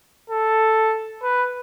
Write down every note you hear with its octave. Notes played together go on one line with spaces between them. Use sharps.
A4
B4